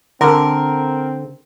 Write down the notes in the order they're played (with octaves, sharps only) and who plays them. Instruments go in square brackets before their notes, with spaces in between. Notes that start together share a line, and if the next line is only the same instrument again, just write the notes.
[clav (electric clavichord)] D3 [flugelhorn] C4 [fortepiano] A#4